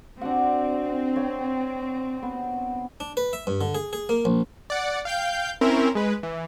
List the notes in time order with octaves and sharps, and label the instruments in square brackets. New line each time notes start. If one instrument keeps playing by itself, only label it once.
[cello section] C4 [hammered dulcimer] D4 F#4 F#5
[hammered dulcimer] C#5 G5 A#5
B3
[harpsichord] D4
B4
E5
G2
D3
G#4
G#4
A#3
A#1
[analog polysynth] D5 F#5
F5 G5 G6
C4 C#4 E4 A#4
G#3 B4
E3